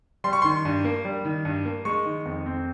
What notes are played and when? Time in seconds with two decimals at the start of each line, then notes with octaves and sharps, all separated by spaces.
0.24 G3 C6
0.33 C#6
0.42 D#3 C6
0.65 G2
0.84 A#3
1.05 G3
1.25 D#3
1.45 G2
1.65 A#3
1.85 G#3 C#6
2.05 D#3
2.26 F2
2.46 C4